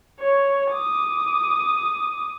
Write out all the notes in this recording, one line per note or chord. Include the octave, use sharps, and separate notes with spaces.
C#5
D6 D#6